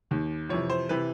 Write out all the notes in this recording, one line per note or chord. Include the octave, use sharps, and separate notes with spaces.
D#2 D#3
F2 C3 E3 C#5
C5
C3 E3 B4